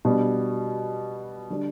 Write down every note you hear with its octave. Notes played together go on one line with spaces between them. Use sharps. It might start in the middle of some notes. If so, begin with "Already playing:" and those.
B2 G3 D4
D3 G3 D4